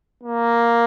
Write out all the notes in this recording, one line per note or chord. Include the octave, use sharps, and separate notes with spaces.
A#3